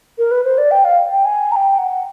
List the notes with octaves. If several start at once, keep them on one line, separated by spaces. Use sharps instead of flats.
A#4
B4
C5
D5
G5
F5
G5
G#5
A#5
G5
F#5